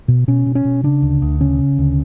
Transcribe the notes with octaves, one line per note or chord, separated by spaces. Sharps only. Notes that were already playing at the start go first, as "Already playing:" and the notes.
B2
B2 C#4
B2
C#4
B2
C#3 D4
D2
D2
C#3 C#4
C#3
D2